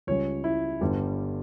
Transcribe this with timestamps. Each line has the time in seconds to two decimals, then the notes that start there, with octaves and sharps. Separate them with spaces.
0.07 C#2 C#3 G3 C#5
0.44 E4
0.81 G1 G2 D3 G3